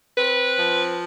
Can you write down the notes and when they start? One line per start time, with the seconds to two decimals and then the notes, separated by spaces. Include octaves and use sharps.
0.18 C4 B4
0.57 F3